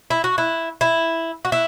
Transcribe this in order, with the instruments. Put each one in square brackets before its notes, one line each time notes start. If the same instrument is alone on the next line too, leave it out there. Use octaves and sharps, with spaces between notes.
[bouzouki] E4
F#4
E4
E4
F#4
E4